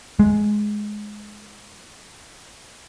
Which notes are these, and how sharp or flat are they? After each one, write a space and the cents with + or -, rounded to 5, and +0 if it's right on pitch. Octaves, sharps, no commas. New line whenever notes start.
G#3 +10